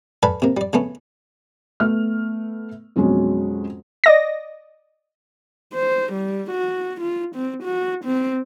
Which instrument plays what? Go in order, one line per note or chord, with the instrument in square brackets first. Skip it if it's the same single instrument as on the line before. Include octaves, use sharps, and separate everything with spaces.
[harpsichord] A4 B4 D5 F5 G#5 B5
C3 A#3
G3 D5
C#3 A3 B3 C#4
[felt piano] A3 B3 F6
F2 B2 F#3 G#3 C#4
[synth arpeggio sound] D5 D#5 A#6
[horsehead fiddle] C5
G3
F#4
F4
C4
F#4
C4